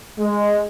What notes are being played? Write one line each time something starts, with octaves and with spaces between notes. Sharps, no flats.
G#3